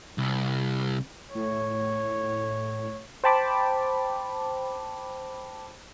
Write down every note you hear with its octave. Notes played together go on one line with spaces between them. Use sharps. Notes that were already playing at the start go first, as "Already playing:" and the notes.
C2
A2 C#5
C5 G5 A5 B5 D6